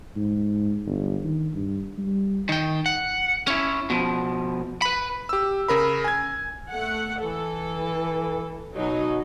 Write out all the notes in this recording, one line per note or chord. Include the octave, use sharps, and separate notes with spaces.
G#2
G1
D#3
G2
G3
D#3 G5
F#5
C#4 E4
B2 F3
B4 B5
G4 E6
C#3 A#4 B5
G#5 G#6
A3 F#5
E3 A4
B2 F#3 D#4